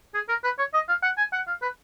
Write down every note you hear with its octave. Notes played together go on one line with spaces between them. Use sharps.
G#4
A#4
B4
C#5
D#5
F5
F#5
G#5
F#5
F5
B4